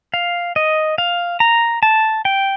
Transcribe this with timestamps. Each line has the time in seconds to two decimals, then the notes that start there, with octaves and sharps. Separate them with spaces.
0.14 F5
0.56 D#5
0.98 F5
1.40 A#5
1.83 A5
2.25 G5